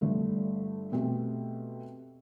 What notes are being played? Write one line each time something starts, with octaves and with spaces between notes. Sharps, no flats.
G1 G2 D3 A3
B2 A3 C4 G4